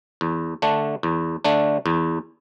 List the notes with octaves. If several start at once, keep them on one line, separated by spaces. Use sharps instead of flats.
E2
D3 A3 D4
E2
D3 A3 D4
E2